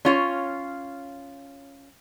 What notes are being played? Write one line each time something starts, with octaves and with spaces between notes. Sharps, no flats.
C#4 F4 C#5